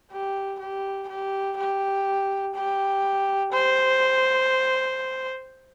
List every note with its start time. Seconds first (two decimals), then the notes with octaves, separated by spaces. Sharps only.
0.11 G4
0.60 G4
1.09 G4
1.57 G4
2.55 G4
3.52 C5